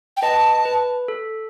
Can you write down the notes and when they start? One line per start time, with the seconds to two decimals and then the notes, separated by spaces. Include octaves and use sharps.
0.17 G5
0.22 B4 D#5 A5
0.65 B4
1.08 A4